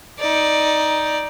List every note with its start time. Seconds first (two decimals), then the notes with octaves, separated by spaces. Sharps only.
0.19 D#4 D5